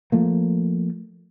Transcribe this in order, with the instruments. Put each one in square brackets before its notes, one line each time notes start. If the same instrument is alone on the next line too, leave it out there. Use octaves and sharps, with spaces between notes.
[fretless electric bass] F3 A3 A#3